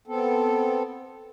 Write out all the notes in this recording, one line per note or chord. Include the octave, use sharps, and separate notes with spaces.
B3 C4 A4